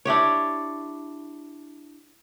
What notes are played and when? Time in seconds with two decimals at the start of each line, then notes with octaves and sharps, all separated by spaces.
0.05 D4 E4 G4 C#5